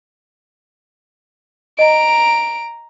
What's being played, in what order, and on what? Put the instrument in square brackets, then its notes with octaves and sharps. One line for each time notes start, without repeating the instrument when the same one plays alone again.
[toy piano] D#5 [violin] A#5 D7